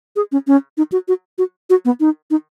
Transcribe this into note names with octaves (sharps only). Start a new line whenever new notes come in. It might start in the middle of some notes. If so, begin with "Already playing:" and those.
G#4
C#4
C#4
D#4
F#4
F#4
F#4
F#4
B3
D#4
D#4